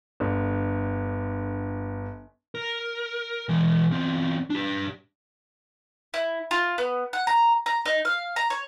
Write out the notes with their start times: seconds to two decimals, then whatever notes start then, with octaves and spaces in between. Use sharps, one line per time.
0.20 G1 D3
2.55 A#4
3.49 E3 G#3
3.91 E2 C4
4.50 D4 G4
6.14 E4
6.51 F4
6.78 B3
7.13 F#5
7.27 A#5
7.66 A#5
7.86 D#4
8.05 F5
8.36 A#5
8.50 C#5